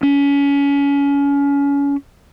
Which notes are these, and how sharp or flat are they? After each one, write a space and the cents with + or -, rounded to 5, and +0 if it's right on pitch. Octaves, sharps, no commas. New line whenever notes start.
C#4 +30